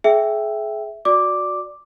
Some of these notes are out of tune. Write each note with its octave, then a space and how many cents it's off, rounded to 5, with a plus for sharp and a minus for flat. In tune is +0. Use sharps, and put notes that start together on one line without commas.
G#4 +30 E5 +0 G5 +0
F#4 -15 D5 +0 D6 +0